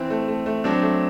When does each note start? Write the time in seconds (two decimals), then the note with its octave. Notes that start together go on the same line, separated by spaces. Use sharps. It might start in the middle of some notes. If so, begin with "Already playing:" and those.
Already playing: E3 C4
0.10 A3
0.28 A3
0.46 A3
0.64 F#3 C4 D4
0.82 A3